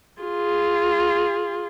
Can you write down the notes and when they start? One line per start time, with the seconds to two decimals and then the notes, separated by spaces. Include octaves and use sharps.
0.22 F4 G#4